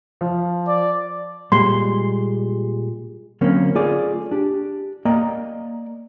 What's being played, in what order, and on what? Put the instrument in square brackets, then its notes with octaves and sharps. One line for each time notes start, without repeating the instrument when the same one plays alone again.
[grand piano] F3
[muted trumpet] D5
[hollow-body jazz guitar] A#2 G3 G#3 [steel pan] C6
[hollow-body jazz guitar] D3 F#3 A#3 C4 C#4
A3 F4 G#4 D5
D4 G4
A#3 D5 D#5 G5 A#5